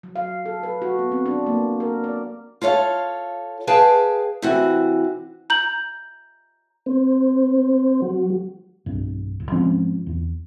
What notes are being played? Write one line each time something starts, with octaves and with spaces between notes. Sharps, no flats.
F#3
F5
A4
B4
F#4
B3
C4
D4
A#3
A#4
D5
F4 A4 C#5 F5
G#4 B4 F5 G5 A5
C3 E3 F#4
A#5 G6 F#7
C4
F#3
B1 G2
D1
G#2 F3 C4 C#4
E2